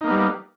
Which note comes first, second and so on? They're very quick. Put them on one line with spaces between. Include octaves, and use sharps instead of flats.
D#4 A#3 B3 G3